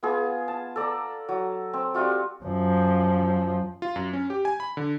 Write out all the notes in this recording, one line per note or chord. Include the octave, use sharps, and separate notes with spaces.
B3 F4 G#4
A5
A4 D5 A#5
F#3
C4
G3 C4 F4 F#4
F#2 F3
F4
F#2
C#4
G4
G#5
B5
D3